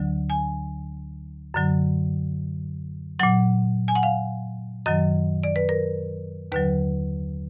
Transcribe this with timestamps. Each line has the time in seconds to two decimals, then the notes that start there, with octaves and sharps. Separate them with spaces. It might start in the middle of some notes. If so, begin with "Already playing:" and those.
Already playing: D2 D3 F#3
0.30 G#5
1.54 F#2 D3 F#3
3.19 A#2 F#3 F#5
3.88 G#5
3.95 F#5
4.03 F5
4.86 F#2 D#3 F#3 D#5
5.43 D5
5.56 B4
5.69 A#4
6.52 D#2 D3 F#3 B4